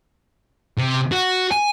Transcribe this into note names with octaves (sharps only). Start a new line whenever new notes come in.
C3
F#4
G#5